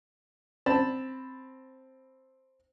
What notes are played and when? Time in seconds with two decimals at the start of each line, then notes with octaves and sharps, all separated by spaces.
0.66 C4 A5 B5